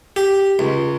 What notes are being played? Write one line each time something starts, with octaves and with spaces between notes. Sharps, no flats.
G4
C#2